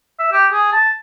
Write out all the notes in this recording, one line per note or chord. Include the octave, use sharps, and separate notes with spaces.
E5
G4
G#4
A5